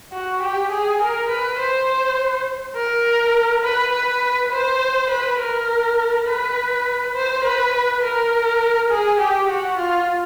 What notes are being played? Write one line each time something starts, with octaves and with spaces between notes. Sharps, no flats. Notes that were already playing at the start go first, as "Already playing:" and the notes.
F#4
G4
G#4
A#4
B4
C5
A#4
B4
B4
C5
B4
A#4
B4
C5
B4
A#4
G#4
G4
F#4
F4